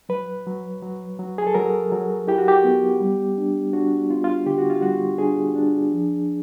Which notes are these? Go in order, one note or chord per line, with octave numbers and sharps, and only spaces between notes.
F#3 B4
F#3
F#3
F#3
G#4
A4
F#3 A#4
F#3
E4 G4
F#4
G4
B3
G3
D4
D4 F#4
B3 F4
F4
D3 G4
F#4
F4
G3 F#4
D4 G#4
D4
F3